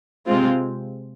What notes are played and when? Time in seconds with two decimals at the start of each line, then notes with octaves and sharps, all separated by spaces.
0.27 C3 G#3 C4 F4